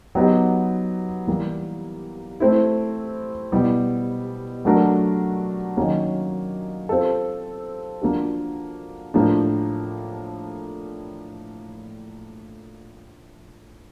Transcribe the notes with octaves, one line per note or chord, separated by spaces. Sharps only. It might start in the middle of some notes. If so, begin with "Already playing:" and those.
F#3 B3 D#4 G4
E3 G3 A#3
A3 C4 E4
B2 G3 B3 E4
F#3 A3 D4 F#4 A#4
D#3 F#3 A#3 C#4
C4 F4 A4
F3 A#3 D4 F#4
A2 F3 A#3 D4